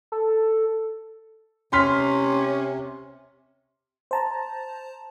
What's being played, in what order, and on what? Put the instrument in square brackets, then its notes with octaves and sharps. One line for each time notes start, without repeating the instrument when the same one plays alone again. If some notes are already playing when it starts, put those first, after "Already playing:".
[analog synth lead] A4
[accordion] C3 [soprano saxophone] C#4 [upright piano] C6 F6 B6
[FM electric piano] C5 A5 A#5